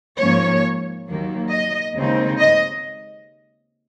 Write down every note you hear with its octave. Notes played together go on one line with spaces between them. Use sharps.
G#2 F3 A#3 C#4 C#5
D#2 D#3 F#3 A#3
D#5
D#2 C#3 G#3 C4 D#4
D#5